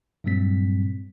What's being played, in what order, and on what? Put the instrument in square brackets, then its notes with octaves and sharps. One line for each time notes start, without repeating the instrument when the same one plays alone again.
[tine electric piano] G2 A#2 F#3 G3 C4 B6